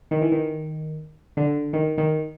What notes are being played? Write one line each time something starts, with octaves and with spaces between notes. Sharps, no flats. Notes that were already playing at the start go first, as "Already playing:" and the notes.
D#3
E3
D#3
D3
D#3
D#3